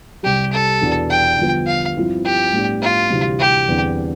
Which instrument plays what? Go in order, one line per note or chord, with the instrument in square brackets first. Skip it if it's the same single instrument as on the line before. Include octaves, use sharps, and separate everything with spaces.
[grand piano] C2 C3 G3 [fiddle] G4
[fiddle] A4
[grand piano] E2 B2 G3 B3 D4
[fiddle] G5
[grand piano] G1 G2 F3 B3
[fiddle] F5
[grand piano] G2 F3 C4 E4
[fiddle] G4
[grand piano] A2 G3 B3 D4
[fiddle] F4
[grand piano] D2 C3 E3 G3
[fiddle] G4
[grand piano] E2 D3 G3 C4